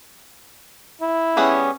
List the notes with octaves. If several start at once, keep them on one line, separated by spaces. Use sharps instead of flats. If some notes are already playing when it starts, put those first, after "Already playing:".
E4
G3 B3 C#4 G#4